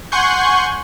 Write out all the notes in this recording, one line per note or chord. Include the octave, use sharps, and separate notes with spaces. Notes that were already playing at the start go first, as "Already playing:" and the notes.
F#5 G#5 C6 C#6 G6